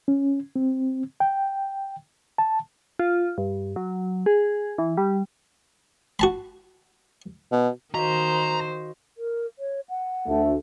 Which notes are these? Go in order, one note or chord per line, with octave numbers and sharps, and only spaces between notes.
C#4
C4
G5
A5
F4
G2
F#3
G#4
E3
G3
F#4 A5 B5
B2
D#3 F#4 C5 D#5 F5 A#5
A#4
C#5
F#5
D2 A3